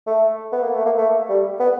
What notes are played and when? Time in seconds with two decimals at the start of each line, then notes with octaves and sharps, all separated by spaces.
0.07 A3
0.52 B3
0.63 A#3
0.74 A3
0.86 A#3
0.98 A3
1.29 G3
1.60 B3